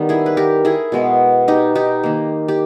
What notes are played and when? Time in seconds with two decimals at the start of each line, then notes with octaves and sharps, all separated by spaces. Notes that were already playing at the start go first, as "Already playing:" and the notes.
Already playing: D#3 G3 B3
0.09 E4 G#4
0.26 B4
0.37 G4 A#4
0.65 E4 G#4
0.92 B2 G#3 B3
1.48 D#4 G4
1.75 D#4 G4
2.03 D#3 A#3
2.48 G4